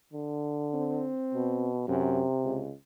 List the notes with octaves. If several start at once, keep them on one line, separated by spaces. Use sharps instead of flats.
D3
C4
B2
F#2 C3
C#2